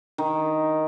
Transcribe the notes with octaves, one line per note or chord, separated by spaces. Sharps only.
D#3